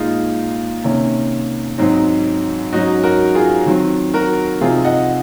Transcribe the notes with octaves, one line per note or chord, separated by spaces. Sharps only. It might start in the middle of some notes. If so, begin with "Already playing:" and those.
Already playing: A#2 G#3 D#4 F4
C3 D#3 A#3 C#4
G#2 F#3 C4 D#4
G#2 F#3 C#4 D#4 F#4
F#4 A#4
F4 G#4
D#3 F#3 C4
F#4 A#4
C3 F3 C4 D#4 F4 G#4
D#5 F#5